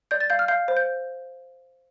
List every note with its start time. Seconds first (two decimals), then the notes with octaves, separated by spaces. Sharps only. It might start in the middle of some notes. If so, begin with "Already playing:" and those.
0.11 D5 G6
0.20 A6
0.30 F5 G6
0.39 F6
0.48 F5 G6
0.68 C5
0.77 G6